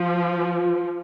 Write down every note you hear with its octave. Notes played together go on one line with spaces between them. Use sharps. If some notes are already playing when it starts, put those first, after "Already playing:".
Already playing: F3